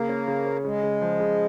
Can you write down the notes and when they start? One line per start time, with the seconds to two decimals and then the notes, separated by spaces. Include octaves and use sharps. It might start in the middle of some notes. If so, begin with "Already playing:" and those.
Already playing: C#3 A#3
0.09 C#4
0.28 C#3
0.46 C#4
0.64 C#3 G#3
0.83 C#3
1.02 F3
1.20 C#3